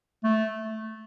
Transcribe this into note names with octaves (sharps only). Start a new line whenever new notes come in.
A3